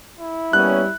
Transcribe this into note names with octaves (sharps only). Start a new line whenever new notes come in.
E4
G3 A#3 B3 C#4 F#6